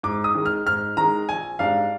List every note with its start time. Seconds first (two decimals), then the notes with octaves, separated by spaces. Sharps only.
0.03 G#2 D6
0.24 D#6
0.35 D#3 G#3
0.46 F6
0.66 G#2 F6
0.97 D#3 G#3 A#5
1.29 A#1 G#5
1.59 G#2 G3 D4 F5